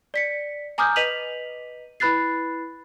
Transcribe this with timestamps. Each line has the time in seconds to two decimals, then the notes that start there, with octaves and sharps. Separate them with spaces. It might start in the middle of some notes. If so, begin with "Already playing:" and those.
0.14 D5 B6 C#7
0.78 G#5 A#5 D6 D#6 F6 G6
0.96 B4 D#5 B6 D#7 F7 F#7
2.00 E4 B4 B5 F#6 A6 C7